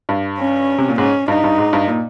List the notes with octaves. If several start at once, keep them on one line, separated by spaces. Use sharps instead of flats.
G2
C#4
C3
A#2
G#2 C#4
G2 D#4
G2
G#2
G2
A#2